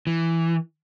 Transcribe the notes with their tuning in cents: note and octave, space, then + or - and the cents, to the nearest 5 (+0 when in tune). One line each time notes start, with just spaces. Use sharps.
E3 +5